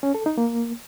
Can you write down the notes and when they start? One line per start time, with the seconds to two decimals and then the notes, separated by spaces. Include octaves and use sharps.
0.03 C#4
0.15 A4
0.26 D#4
0.38 A#3